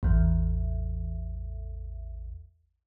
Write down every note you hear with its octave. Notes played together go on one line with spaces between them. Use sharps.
A1 E2